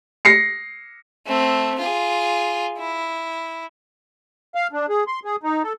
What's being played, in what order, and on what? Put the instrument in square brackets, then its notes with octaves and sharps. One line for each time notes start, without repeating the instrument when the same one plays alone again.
[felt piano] A#6 C7 C#7
[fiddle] A3 C4
F4 G#4
E4
[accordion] F5
D4
G#4
C6
G#4
D#4
A4